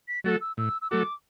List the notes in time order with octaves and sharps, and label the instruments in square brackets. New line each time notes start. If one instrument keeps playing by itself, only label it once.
[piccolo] B6
[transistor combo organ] F#3 A3 F#4 A4 [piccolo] A6
[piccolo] E6
[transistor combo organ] A2 [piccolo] E6
[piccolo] E6
[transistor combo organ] F#3 A3 F#4 A4 [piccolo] D6